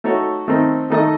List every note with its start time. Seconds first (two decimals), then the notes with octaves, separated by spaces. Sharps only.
0.04 A3 D#4 F#4 A4 C#5
0.48 D#3 A3 C4 D#4
0.90 D#3 A3 D#4 A4 D#5